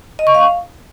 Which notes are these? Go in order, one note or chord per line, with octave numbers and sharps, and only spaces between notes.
D#5
C#6
F5